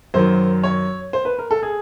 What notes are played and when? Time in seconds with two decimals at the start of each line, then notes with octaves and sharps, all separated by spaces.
0.14 F#2 D#3 F#3 C5
0.64 C#5
1.13 C5
1.25 B4
1.39 A#4
1.51 A4
1.63 G#4